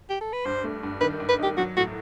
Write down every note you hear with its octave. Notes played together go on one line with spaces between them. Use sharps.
G4
A4
B4
G2 C5
A3
G2
D#3 B4
G2
B4
D#4 G4
F#3 F#4
A2 F#4